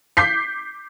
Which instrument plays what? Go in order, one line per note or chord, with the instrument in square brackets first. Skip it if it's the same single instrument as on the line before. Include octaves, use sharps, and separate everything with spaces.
[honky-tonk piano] D6 G6 B6 C7